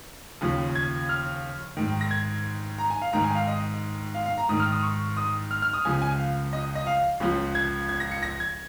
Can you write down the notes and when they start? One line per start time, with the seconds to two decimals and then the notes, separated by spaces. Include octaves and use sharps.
0.41 D#2 C#3 F3
0.75 G#6
1.09 F6
1.77 G#2 D#3
2.01 A#6
2.11 G#6
2.78 A#5
2.90 G#5
3.02 F5
3.13 G#2 D#3 A#5
3.24 G#5
3.35 F5
3.47 D#5
4.15 F5
4.26 F5
4.38 A#5
4.49 G#2 D#6
4.52 D#3
4.60 F6
4.71 D#6
4.83 C#6
5.17 D#6
5.51 F6
5.62 F6
5.73 D#6
5.85 C#2 C#3 F3 G#5
6.02 G#5
6.19 F5
6.53 D#5
6.75 D#5
6.87 F5
7.20 C#2 C#3 F3
7.55 G#6
7.89 G#6
8.00 A#6
8.11 C#7
8.23 A#6
8.40 G#6